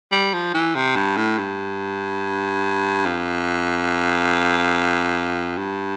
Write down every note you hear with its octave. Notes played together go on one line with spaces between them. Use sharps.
G3
F3
E3
C3
G2
A2
G2
F2
G2